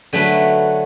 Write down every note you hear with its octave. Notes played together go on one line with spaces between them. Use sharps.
D3 F#3 A3 B4